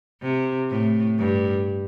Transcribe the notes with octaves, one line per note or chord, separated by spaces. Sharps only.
C3
A2
G2